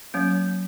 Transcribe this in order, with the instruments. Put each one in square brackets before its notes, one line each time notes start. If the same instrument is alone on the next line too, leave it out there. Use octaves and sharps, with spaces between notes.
[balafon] F#3 A#3 C#4